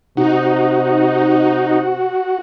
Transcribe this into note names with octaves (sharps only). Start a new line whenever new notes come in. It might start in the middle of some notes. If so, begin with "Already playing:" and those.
C3 D#4 F#4